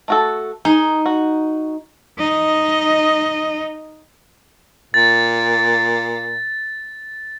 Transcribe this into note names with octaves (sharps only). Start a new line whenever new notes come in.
A3 F#4 A4
D#4 G#4
F#4
D#4 D#5
A#2 A6